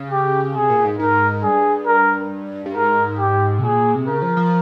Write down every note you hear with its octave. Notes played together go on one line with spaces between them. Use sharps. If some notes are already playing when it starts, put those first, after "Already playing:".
Already playing: C#3
G4
C3 G#4
A#2
G#2
G#2 A#4
G2 G#4
A#4
G2
G#2 A#4
G4
C3
A#2 G#4
C3
C#3 A#4
F3
F3